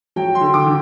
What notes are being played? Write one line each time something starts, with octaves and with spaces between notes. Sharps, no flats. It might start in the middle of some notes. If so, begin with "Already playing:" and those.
F#3 G5
C6
D3
D6
D3